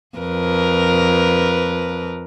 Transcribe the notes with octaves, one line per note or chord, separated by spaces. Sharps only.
F2 A#4 B4